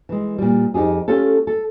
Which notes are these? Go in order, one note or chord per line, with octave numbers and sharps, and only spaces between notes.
E3 G#3
A#2 G3
F2 D#4 F4 G4 G#4
A3 C#4 F4 G4 A4
A4